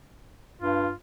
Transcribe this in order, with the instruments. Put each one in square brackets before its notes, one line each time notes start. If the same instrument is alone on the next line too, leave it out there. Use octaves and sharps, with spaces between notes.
[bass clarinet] G2 [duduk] F4